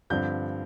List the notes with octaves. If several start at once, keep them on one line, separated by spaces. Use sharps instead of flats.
G2 D3 F3 C4 G6